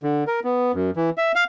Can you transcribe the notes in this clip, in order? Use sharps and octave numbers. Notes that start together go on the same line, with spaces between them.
D3
A#4
B3
F#2
E3
E5
F5